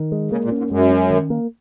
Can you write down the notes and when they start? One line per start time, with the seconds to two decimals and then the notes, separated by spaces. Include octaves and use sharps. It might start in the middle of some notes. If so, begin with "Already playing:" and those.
Already playing: D#3
0.12 G#3
0.31 C#3 A#3
0.44 A#2
0.52 C#4
0.58 G#2
0.71 F#2 G#3
0.91 C#4
1.10 D#3
1.30 A#3